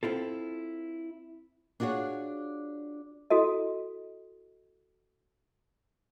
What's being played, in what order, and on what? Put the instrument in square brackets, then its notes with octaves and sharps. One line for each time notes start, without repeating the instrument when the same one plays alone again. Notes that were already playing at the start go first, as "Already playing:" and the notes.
[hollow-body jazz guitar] C4 E4 F4 A4
[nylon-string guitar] D4 F4 F#4 G#4 C#5
[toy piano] E4 F#4 A4 D#5